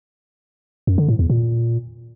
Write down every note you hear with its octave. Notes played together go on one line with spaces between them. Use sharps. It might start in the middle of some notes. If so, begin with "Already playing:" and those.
F#2
D3
A2
E2
A#2